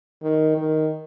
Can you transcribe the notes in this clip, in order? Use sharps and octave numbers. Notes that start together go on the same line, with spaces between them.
D#3
D#3